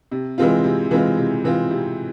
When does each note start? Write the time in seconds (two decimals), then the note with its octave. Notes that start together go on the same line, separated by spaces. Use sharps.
0.12 C3
0.38 E3 G#3 C4 F4
0.64 C3
0.91 E3 G#3 C4 F4
1.17 C3
1.44 E3 G#3 C4 F4
1.71 C3